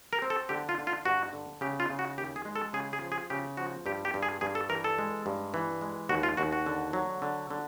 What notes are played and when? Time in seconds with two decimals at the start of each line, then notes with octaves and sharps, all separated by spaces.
0.13 A#4
0.22 C4
0.30 A4
0.49 D3 G4
0.69 F4
0.78 D3
0.87 F4
1.05 G2 F#4
1.33 D3
1.61 C#3 G4
1.80 F4
1.90 C#3
1.99 F#4
2.18 D#2 G4
2.36 G#4
2.45 G#3
2.56 A4
2.73 C#3 G#4
2.93 G#4
3.01 F3
3.12 G#4
3.30 C#3 G4
3.57 F3 F#4
3.86 G2 G4
4.05 G4
4.14 G2
4.23 G#4
4.41 G2 G#4
4.55 A4
4.69 E3 A#4
4.84 A4
4.98 G#3
5.26 G2
5.54 E3
5.81 G#3
6.09 D#2 F#4
6.23 F4
6.37 D#2 F#4
6.53 F#4
6.66 D3
6.93 F#3
7.22 D3
7.51 D3